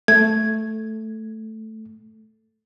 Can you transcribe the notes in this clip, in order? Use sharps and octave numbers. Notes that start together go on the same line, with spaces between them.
A3 G#6